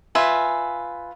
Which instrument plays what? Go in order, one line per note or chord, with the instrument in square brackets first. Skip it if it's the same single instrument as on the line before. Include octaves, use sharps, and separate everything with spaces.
[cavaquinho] F4 B4 E5 G#5